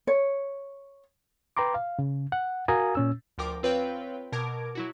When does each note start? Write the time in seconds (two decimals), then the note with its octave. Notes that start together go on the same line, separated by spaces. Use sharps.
0.07 C#5
1.57 B4 G5 A#5 C6 D6
1.74 F5
1.99 C#3
2.32 F#5
2.68 F#4 A#4 F5 G#5 A#5 D#6
2.95 A#2 C#4 E6
3.38 D2 F3 A#4 G5 D6
3.63 C4 F4 B4 C#5 F5 G5
4.32 B2 A#4 A5 D6 G#6 D7
4.75 F#3 E4 F#4